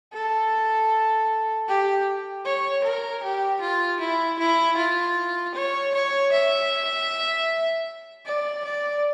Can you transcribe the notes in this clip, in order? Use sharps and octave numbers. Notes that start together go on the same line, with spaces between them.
A4
G4
C#5
A#4
G4
F4
E4
E4
F4
C#5
C#5
E5
D5
D5